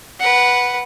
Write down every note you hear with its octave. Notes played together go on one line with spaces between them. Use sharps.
B4 F#5